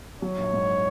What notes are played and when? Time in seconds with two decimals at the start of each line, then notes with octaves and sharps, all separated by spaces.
0.22 F#3 C#5
0.38 A#1
0.53 G#2